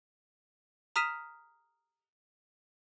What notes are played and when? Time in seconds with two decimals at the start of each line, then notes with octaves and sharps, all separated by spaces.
0.96 A#5 D#6 F6 B6 D#7 E7